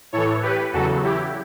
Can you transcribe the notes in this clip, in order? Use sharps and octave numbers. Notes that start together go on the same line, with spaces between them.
A2 E3 A4 C#5
G4 B4
E2 C#3 F#3 F#4 A4
E4 G4